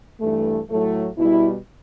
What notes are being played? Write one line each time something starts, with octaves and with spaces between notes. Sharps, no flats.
G2 E3 A3
A2 F#3 A3
B2 G3 E4